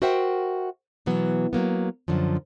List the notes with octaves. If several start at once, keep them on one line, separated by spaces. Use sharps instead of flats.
F#4 A#4 C5 E5 F#5 G5
B2 E3 F#3 B3
F#3 A#3 B3
F#2 D3 F3